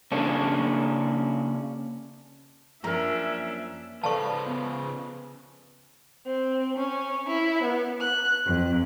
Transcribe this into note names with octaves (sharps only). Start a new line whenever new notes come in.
C#3 A#3 C#4 D4
F#2 F3 A#3 C#4 D4 A#4 E5 A#5
C#3 F3 A4 B4 D5 F5 A5 C#6
B3
C4
C#4
E4
B3
F#6
F2